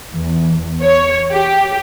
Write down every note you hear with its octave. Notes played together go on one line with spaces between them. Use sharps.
E2
C#5
G4